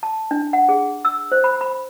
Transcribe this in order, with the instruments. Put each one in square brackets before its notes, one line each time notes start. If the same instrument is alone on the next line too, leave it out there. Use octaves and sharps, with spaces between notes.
[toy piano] A5
D4
F#5
G#4
E6
C5
B5
B5